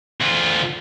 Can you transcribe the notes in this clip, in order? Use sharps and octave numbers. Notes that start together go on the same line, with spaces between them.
D2 F4